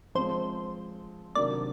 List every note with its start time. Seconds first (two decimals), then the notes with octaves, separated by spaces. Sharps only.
0.15 F3 G#3 C4 C5
1.35 C3 D#3 F#3 A#3 D4 D5